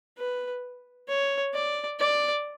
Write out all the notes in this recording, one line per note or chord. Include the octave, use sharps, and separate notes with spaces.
B4
C#5
D5
D5